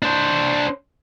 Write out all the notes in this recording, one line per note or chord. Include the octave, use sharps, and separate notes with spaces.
D4 C5